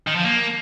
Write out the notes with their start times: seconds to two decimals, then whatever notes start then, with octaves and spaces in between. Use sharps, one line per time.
0.07 D#3
0.16 F3
0.24 A#3